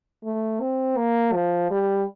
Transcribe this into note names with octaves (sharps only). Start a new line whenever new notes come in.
A3
C4
A#3
F3
G3